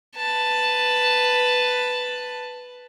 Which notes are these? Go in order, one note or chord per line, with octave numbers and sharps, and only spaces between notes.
B4 A5